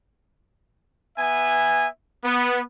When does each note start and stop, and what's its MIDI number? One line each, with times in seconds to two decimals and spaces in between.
1.18 1.87 59
1.18 1.87 76
1.18 1.87 80
2.24 2.61 59